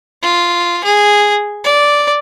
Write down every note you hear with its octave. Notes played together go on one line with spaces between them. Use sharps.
F4
G#4
D5